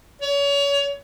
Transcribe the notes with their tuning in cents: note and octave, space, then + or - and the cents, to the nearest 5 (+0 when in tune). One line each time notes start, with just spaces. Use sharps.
C#5 +30